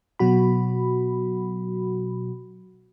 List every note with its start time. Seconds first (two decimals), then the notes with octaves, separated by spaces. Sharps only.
0.19 B2 F#3 F#4 B5